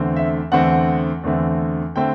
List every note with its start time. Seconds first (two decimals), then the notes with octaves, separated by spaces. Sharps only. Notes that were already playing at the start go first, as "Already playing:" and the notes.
Already playing: E2 D3 A3 C4
0.16 E5
0.52 E2 D3 A3 C4 F#5
1.24 E2 D3 A3 C4
1.96 D3 A3 C4 G5